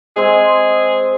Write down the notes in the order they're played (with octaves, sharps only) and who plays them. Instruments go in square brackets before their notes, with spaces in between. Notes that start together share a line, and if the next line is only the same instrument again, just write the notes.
[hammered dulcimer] G#3 C4 G#5 [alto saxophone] G#4